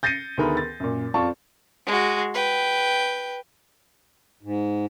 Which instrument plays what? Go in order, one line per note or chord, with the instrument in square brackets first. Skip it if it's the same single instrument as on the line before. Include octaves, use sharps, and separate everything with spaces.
[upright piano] G6 A6 A#6 C7 C#7 D#7
D2 D#3 B3 G#4 A#4 B4
A6
F#2 A#2
F2 F4 D5 A5 C#6
[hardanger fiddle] G#3 F#4
B4 G5
[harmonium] G#2